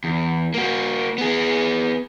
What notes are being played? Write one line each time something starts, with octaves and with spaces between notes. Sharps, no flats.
E2
A#3 F#4
B3 G#4